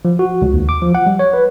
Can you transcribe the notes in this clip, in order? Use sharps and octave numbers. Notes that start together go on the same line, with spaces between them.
F3
F#4
C#2
D#2
D6
F3
F#5
G3
C#5
B4